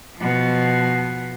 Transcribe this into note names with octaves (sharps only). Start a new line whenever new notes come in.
B2 F3